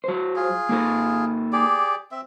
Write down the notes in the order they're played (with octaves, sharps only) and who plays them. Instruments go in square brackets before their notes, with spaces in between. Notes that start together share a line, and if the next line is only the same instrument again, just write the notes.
[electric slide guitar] F#3 C5
[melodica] F4 G#4
[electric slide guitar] A#3 D#4 A4
[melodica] G4 G#4 D5
C4 E5